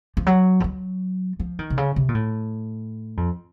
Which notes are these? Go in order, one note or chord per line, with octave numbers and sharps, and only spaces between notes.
F3
F#3
F3
F#3
F3
D#3
C3
C#3
C3
A#2
A2
F2